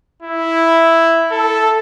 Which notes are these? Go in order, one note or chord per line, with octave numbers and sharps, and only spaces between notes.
E4
A4